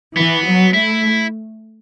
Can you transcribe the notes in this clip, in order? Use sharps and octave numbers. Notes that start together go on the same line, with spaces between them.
E3 B3
F#3
A3 E4